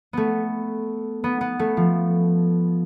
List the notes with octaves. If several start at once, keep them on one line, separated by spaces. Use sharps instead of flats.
A3 B3
B3
B3
A3
F3